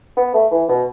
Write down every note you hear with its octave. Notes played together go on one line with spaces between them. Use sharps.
B3
A3
E3
B2